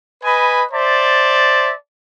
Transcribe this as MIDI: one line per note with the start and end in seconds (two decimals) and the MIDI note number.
0.24 0.64 71
0.24 0.64 75
0.24 0.64 80
0.24 0.64 83
0.72 1.72 72
0.72 1.72 74
0.72 1.72 76
0.72 1.72 81